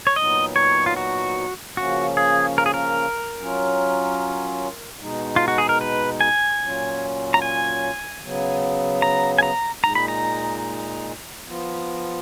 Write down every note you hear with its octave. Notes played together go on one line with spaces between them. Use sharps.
C#5
A#2 F#3 B3 D#4 D#5
C#5
F4
F#4
C#3 F3 A#3 C#4 F#4
G#4
A#4
G#4
A#4
F#3 C#4 F4
B2 G#3 D#4
F4
F#4
G#4
A#4
B4
G#5
A#2 F#3 C#4 F4
A#5
G#5
C#3 F#3 B3
A#5
G#5
A#5
A#2 G#3 D#4 A#5
B5
A#5
F3 B3 F4